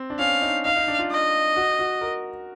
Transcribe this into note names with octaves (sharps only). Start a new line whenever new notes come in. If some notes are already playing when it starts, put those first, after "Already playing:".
Already playing: C4
D4
C#4 F5
D#4
D#4 F5
D#4
D4
F4
D#5
F#4
F#4
A#4